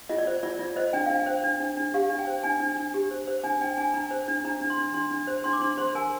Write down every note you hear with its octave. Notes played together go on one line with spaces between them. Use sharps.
F4 D#5
D5
C5
F4 D5
F4 D5
C5 D#5
D4 G5
D4 F5
G5
C5
D4
D4
D4
G4 F5
D4
G5
C5
D4 G#5
D4
D4
G4
C5
C5
D4 G#5
D4 G5
D4 G#5
D4 A#5
C5
D4
D4 A#5
D4
C6
D4
D4 C6
D4
C5
D4 C6
D6
D4 C6
C5 C6
A#4 G#5